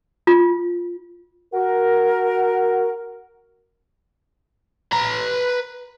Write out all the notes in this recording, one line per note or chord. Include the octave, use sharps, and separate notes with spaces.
F4
F#4 A#4
B4 A#5